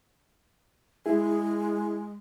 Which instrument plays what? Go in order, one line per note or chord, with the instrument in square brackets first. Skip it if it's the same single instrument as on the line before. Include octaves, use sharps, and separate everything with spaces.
[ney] G#3 [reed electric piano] E4 G#4